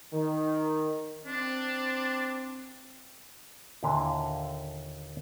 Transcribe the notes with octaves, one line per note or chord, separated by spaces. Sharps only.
D#3
C4 D4
D#2 A#2 D3 E4 F5